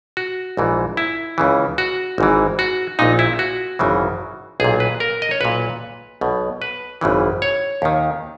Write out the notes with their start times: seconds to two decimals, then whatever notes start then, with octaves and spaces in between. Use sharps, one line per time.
0.17 F#4
0.57 A#1 G#2 E3
0.97 E4
1.38 C#2 C#3 E3
1.78 F#4
2.18 G#1 G#2 E3
2.59 F#4
2.99 A#1 A#2 D#4
3.19 E4
3.39 F#4
3.79 G#1 F#2 C#3 E3
4.60 B1 A#2 G#4
4.80 B4
5.00 A#4
5.22 D#5
5.31 C#5
5.40 B1 A#2 B4
6.21 B1 B2
6.62 B4
7.01 G#1 F#2 C#3 E3
7.42 C#5
7.82 D#2 D#3